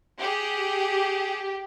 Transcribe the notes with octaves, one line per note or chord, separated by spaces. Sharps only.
G4 G#4 F#5